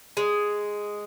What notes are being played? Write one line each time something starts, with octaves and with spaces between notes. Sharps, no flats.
G#3